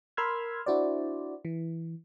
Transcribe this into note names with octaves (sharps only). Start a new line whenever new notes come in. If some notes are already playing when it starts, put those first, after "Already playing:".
A#4 B5 C6 E6 F6 G#6
D4 E4 F#4 C5 D5
E3